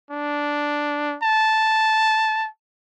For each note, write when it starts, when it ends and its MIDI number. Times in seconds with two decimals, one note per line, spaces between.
0.11 1.16 62
1.23 2.47 81